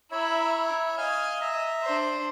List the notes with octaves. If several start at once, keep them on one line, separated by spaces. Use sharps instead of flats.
E4 C#5 E5 A#5 B5
D#5 F5 G#5 F6
E5 A#5
D4 C5